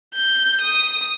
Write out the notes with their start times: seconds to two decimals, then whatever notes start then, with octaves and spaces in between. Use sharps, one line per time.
0.15 G6
0.61 D#6